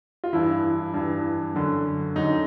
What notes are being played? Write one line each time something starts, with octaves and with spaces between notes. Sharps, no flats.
F4
G2 E3 E4
G2 E3
F#2 D3
F#2 D3 D#4